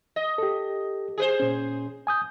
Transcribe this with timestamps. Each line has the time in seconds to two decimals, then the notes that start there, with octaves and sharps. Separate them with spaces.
0.16 D#5
0.38 G4 A4
1.18 G#4 B4 C5
1.40 A#2 C#4
2.07 G#5 D#6 G6